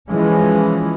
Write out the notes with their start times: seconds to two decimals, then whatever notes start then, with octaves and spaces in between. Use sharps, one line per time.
0.10 E3 F3 G#3 C#4